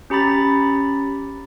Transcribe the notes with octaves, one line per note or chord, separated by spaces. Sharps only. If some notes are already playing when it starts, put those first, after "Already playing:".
C#4 G4 A#5 B5 A6